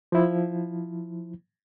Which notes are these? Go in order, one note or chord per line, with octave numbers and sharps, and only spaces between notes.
F3 E4